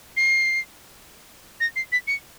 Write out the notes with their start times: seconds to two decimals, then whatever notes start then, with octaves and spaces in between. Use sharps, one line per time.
0.17 C7
1.60 A#6
1.76 C7
1.92 B6
2.07 C#7